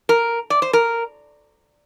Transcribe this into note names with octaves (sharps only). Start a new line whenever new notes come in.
A#4
D5
C5
A#4